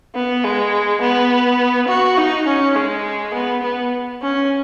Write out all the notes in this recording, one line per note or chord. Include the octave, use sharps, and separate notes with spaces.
B3
G#3
B3
F#4
D#4
C#4
G#3
B3
B3
C#4